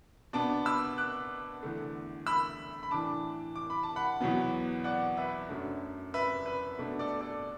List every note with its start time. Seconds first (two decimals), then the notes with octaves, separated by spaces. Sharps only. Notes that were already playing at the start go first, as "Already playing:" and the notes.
0.33 B2 B3 D4 A5 D6
0.65 B5 E6
0.98 D6 F#6
1.63 E2 D3 A3
2.27 B5 E6
2.83 B5
2.91 A2 E3 D4 A5 D6
3.56 D6
3.70 B5
3.83 A5
3.96 F#5 B5
4.21 E2 B2 F#3 B3
4.84 D5 F#5
5.17 B4 E5
5.49 F#2 F#3 A3 D4
6.14 B4 E5
6.46 B4
6.79 B2 A3 D4
6.99 A4 D5
7.21 A4 D5